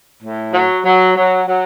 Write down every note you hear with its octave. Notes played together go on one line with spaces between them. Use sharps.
A2
F#3
F#3
F#3
F#3